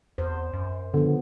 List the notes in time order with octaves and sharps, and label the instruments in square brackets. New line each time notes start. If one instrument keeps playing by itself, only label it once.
[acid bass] E2 [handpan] C5
[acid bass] F#2
[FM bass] D3 [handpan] F3 B3